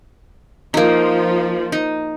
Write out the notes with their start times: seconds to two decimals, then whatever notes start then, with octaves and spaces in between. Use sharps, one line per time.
0.74 F3 A#3 D#4
1.72 D#4